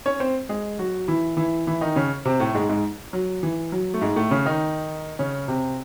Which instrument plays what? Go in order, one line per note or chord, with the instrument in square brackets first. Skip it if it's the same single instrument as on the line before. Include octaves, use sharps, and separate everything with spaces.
[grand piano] C#4 C#5
C4 C5
G#3 G#4
F#3 F#4
E3 E4
E3 E4
E3 E4
D#3 D#4
C#3 C#4
C3 C4
A2 A3
G#2 G#3
G#2 G#3
F#3
E3
F#3
A3
G#2 G#3
A2 A3
C#3 C#4
D#3 D#4
C#3 C#4
C3 C4